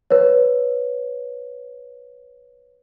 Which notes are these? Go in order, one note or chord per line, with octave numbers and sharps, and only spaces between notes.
B4 C#5